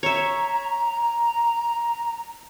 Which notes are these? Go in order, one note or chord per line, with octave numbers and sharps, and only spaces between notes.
C#5 E5 A#5